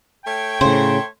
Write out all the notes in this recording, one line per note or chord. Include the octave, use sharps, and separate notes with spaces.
A3 C#5 G5
A2 C#3 C5